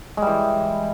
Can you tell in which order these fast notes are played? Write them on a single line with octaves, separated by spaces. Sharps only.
G#3 G3 E3